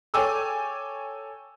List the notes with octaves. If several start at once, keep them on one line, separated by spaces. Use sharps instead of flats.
A4 C#5 G5 G#5 D6 E6